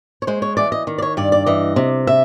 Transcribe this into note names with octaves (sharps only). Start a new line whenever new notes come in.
C#5
G#3 C5
C#5
E3 D5
D#5
D#3
D5
C#5
G2 D5
D5
E3 D#5
C3
E5